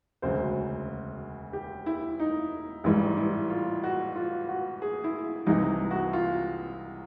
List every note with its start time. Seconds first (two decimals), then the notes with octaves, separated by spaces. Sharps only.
0.22 E1 D2 C#3 F#3 C5
1.53 G4
1.86 E4
2.20 D#4
2.84 A1 G#2 E3 G3 E4
3.17 E4
3.50 F4
3.84 F#4
4.16 F4
4.49 F#4
4.82 G#4
5.04 E4
5.46 C2 C3 E3 D#4
5.91 F#4
6.13 F4